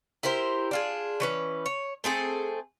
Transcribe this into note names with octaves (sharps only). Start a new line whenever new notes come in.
E4 G4 A#4 C5
D4 F4 G#4
E3 C#4 B4
C#5
A3 C4 G#4 A4